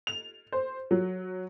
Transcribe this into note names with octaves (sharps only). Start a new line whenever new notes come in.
F7
C5
F#3